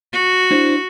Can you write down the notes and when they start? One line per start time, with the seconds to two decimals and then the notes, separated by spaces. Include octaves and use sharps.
0.13 F#4
0.51 D4 E4 C5